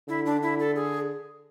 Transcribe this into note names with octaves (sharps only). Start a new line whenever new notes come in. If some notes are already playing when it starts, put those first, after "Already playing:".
D3 E4
D4
E4
A4
G#4